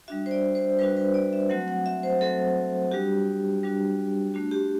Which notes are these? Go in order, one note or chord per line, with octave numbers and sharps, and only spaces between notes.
G3 D4 F#4 E5
C5
D5
C5
G3 D4 F#4 B4
B4
D5
E5
F#3 A3 C4 F#4 F#5
F#5
E5
C5
F#3 A3 C4 F#4 A4
G3 D4 F#4 G4
G3 D4 F#4
A3 D4 F#4
G4